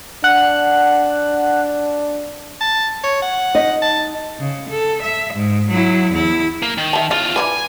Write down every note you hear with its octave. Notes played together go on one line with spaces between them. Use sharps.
D4 F#5 F#6
A5
C#5
F#5
D#4 D#5
A5
C#3
A4
E5
G#2
F#3 E4
E2 E4
A#3
D#3
E5 A5
E2 C#3 F4
E3 D4 B4 G#5